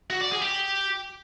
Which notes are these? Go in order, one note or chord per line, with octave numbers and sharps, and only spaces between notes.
F#4
D5
G#4
G4